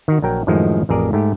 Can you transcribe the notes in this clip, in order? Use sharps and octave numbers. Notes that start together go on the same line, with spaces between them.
D#3 F#4
A#1 F#3 A#4 G5
F#2 A2 D#3 F3 G#3
A1 F2 G#4 A#4 D5
G#2 A3 G4